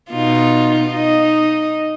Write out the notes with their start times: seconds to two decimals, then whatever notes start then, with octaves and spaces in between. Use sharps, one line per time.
0.10 B2 D#4 F4
0.87 D#4 D#5